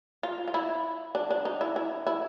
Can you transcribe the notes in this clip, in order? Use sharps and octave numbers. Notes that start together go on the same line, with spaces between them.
F4
F4
E4
D4
D4
D#4
E4
E4
E4